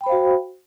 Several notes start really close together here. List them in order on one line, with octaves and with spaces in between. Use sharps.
G5 B5 C5 F5 F#4